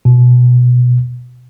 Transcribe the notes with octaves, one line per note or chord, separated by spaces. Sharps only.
B2